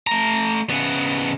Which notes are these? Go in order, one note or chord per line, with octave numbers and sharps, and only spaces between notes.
A3 A#5
C#3 B3